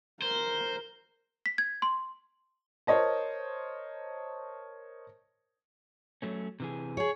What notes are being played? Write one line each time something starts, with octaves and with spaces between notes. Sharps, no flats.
A#4 C5
B6
G#6
C6
A#4 C5 C#5 D#5 A5
F#3 A3 C#4
C3 E3 G#4
G#4 C#5